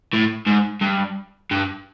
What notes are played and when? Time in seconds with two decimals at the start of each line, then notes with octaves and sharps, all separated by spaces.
0.13 A2
0.47 G#2
0.82 G2
1.51 G2